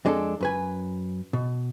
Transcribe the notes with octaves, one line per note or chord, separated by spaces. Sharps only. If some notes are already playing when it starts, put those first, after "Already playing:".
F2 G#3 D4 G4 A4
F#2 B4 G#5
B2